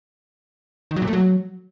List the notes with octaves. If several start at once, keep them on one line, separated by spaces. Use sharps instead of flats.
D#3
F#3
A#2
A3
F#3